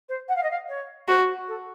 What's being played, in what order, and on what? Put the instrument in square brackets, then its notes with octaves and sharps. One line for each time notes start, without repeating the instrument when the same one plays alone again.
[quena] C5
F#5
F5
D#5
F5
C#5
[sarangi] F#4 [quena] C5
[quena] A4